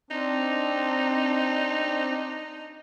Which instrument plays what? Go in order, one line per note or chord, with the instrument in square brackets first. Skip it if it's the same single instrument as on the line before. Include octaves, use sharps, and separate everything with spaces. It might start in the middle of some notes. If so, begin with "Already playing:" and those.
[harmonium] C4 D4 [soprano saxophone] D#4